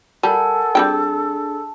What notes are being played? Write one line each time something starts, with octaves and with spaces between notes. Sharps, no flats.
G3 A4 A#4 F#5 G#5 A5
G3 C4 D4 G#4 G5 E6